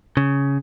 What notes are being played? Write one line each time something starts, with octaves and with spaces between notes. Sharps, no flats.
C#3